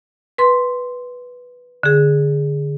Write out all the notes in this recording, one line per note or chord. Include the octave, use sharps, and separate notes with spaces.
B4 C6
D3 G#4